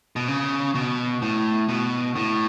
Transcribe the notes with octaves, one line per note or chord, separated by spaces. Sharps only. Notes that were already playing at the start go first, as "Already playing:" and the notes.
B2
C#3
B2
A2
B2
A2